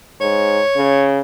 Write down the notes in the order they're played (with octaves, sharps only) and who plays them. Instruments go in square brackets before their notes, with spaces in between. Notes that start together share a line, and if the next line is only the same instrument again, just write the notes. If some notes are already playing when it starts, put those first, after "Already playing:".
[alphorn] G#2 [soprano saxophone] C#5
[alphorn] C#3